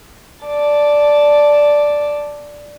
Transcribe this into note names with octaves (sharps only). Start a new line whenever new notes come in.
D5 A5